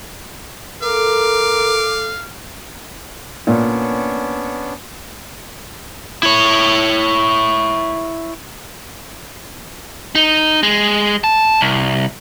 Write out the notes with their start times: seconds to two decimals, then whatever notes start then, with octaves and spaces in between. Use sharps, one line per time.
0.82 A4 A#4 F5 D6
3.47 A#2 B3 C#4 D4
6.23 E4 C#5
10.15 D#4
10.63 G#3
11.24 A5
11.61 C2